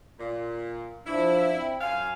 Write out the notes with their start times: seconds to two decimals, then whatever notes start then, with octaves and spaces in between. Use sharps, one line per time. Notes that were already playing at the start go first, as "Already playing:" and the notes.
0.19 A#2
1.07 F3 D4 E4
1.51 C4
1.81 F#2 F#3 F5 G#5